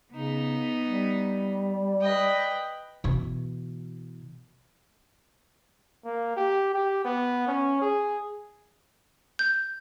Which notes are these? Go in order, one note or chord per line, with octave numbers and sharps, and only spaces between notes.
C#3 B3 D#4
G3
D5
B4 D#5 G5
B2 E3
A#3
G4
G4
B3
C#4
G#4
G6